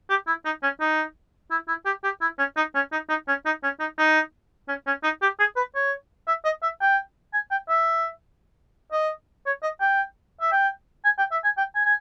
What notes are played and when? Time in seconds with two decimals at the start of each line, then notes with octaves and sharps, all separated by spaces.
0.10 G4
0.27 E4
0.45 D#4
0.63 C#4
0.80 D#4
1.51 E4
1.68 E4
1.86 G4
2.04 G4
2.21 E4
2.39 C#4
2.57 D#4
2.75 C#4
2.92 D#4
3.09 D#4
3.28 C#4
3.46 D#4
3.63 C#4
3.80 D#4
3.98 D#4
4.68 C#4
4.87 C#4
5.04 D#4
5.22 G4
5.40 G#4
5.57 B4
5.75 C#5
6.28 E5
6.45 D#5
6.63 E5
6.81 G5
7.34 G#5
7.51 G5
7.69 E5
8.93 D#5
9.46 C#5
9.63 D#5
9.81 G5
10.41 E5
10.52 G5
11.05 G#5
11.19 G5
11.32 E5
11.44 G#5
11.58 G5
11.75 G#5
11.85 G#5